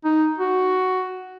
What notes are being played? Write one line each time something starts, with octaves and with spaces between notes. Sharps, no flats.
D#4
F#4